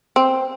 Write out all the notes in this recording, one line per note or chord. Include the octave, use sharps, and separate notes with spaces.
C4